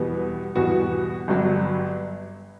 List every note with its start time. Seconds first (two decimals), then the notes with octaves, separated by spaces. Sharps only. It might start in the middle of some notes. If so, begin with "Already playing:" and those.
Already playing: E2 B2 G3 B3
0.55 E2 B2 G3 B3 F#4
1.28 G1 G2 F#3